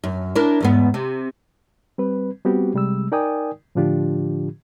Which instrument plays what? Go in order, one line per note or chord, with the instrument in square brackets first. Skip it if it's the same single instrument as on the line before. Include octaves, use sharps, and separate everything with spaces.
[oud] F#2
D4 E4 A#4
E2 G#2 B3
C3
[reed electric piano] G3 C4 B4
G3 B3 C4 F#4 G4
C3 G3 G#3 E6
D#4 A#4 D5 G5 G#5 D#6
A2 D3 F3 D4 F4 G4